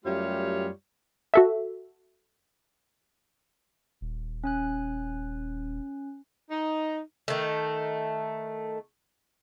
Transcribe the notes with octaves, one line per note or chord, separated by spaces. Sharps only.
F#2 G3 A3 F4 G4 C#5
F#4 A4 E5
D#1
C#4 G#5 F#6
D#4
D#3 A3